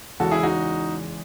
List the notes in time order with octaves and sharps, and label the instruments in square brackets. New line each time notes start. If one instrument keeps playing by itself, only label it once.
[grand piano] E2 C#3 E3 G#3 F#4 A4
E4 G#4
D#4 F#4